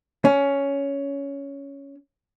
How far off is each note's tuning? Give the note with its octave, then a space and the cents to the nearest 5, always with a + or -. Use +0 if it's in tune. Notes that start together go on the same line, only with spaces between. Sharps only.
C#4 +10